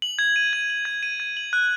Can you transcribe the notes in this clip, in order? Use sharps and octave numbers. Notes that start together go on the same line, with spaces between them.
F#7
G#6
D#7
G#6
F#7
G#6
D#7
G#6
F#7
F#6